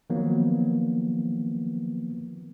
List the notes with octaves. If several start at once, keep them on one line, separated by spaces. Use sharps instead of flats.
D#3 F3 F#3 A#3 B3